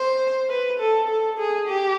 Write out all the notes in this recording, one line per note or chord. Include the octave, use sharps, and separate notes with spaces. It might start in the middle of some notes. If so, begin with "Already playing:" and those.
Already playing: C5
B4
A4
A4
G#4
G4